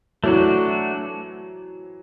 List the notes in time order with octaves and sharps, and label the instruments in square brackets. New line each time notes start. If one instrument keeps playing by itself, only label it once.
[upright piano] E3 F#3 [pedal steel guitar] A3 D4 F#4